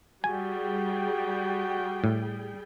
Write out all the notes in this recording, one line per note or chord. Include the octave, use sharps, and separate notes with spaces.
G3 F#4 G#4 G5 G#5
A2